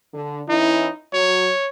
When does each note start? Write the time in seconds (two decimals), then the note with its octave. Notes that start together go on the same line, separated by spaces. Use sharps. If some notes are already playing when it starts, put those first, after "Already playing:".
0.14 D3
0.49 E3 C#4 D#4 E4
1.13 F#3 C#5